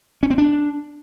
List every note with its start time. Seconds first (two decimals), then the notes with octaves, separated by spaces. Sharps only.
0.23 C#4
0.30 C4
0.38 D4